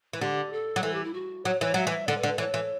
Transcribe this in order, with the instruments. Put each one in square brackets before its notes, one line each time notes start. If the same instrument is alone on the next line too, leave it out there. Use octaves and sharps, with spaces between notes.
[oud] E3
[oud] D3 [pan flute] G4
[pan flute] A4
[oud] F#3
[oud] E3 [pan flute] A4
[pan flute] G4
E4
F#4
[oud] F#3 [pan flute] C#5
[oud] E3 [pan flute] C#5
[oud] F#3 [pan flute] E5
[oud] E3
[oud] D3 [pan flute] D5
[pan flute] B4
[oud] D3
[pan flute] B4
[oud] E3 [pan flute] C#5
[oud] E3